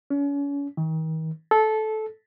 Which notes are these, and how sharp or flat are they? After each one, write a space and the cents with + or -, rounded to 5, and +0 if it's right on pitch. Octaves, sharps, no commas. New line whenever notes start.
C#4 +35
D#3 +40
A4 -15